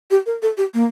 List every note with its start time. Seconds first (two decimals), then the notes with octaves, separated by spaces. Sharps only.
0.11 G4
0.26 A#4
0.42 A4
0.57 G4
0.74 A#3